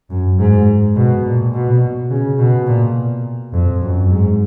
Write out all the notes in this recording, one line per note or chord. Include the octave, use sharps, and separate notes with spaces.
F#2
G#2
B2
A#2
B2
C#3
B2
A#2
F2
F#2
G#2